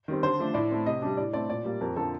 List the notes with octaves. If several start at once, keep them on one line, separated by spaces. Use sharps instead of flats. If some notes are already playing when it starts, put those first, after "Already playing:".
D#3 G3 C4
D3 C5
F3 A3 D4
A2 D5
A3 C4
C3 D#5
G3 D4
A2 D5
A3 C4 D5
A#2 D5
G3 A#3
F2 A#4
D3 F3 A4